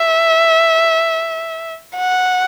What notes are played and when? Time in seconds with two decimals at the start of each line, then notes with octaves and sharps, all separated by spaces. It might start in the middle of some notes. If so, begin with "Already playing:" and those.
Already playing: E5
1.96 F#5